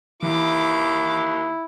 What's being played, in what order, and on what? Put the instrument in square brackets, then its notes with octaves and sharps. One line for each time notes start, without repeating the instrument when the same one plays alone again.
[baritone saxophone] D#2 [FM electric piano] E3 [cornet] E4 [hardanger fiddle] D6